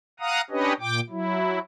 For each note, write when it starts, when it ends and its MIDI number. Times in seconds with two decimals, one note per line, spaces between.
0.20 0.41 77
0.20 0.41 78
0.20 0.41 82
0.20 0.41 87
0.50 0.73 61
0.50 0.73 62
0.50 0.73 67
0.50 0.73 71
0.50 0.73 73
0.50 0.73 75
0.80 1.00 46
0.80 1.00 79
0.80 1.00 86
1.10 1.59 54
1.10 1.59 64